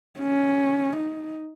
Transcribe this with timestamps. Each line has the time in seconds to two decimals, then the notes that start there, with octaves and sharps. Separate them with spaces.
0.20 C#4
0.97 D#4